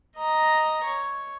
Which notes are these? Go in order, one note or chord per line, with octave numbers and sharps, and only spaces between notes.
D#5 A#5
C#5